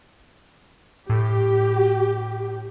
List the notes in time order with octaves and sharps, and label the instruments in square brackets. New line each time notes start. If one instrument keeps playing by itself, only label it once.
[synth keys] A2 [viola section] G4